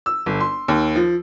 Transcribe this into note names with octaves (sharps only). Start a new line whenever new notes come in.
E6
G1
C6
D#2
F3